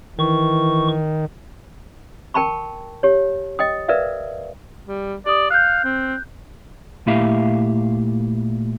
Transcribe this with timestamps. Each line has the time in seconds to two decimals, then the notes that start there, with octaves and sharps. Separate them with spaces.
0.18 D#3 E3 C#6
2.34 A#4 G5 A5 B5 C#6
3.03 G4 C#5
3.59 D#5 G5 D#6
3.88 A#4 B4 D5 E5 F5
4.86 G3
5.26 G4 D5 D#6
5.50 F5 F#6 G6
5.84 C4
7.07 A#2 A3 E4 G4 E5 F5